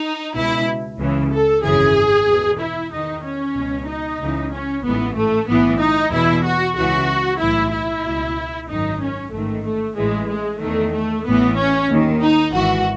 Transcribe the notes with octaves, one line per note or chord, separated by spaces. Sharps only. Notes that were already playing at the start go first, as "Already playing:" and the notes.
Already playing: D#4
C#2 B2 E4
C#2 C#3 E3
A4
G#1 F#2 C#3 E3 G#4
E2 B2
E4
E2 D#3 D#4
C#4
C#2 B2
D#4
C#2 C#3 E3
C#4
A1 G#2 E3 B3
A3
B1 A2 E3 B3
D#4
E2 B2 E4
F#4
C#2 C#3 E3 F#4
B1 A2 E3 E4
E4
C#2 B2
G#1 F#2 D#3 D#4
C#4
A1 G#2 D#3 A3
A3
A1 A2 E3 G#3
G#3
E2 D#3 A3
A3
A1 A2 E3 B3
C#4
D#2 D#3
D#4
G#1 G#2 E3 F#4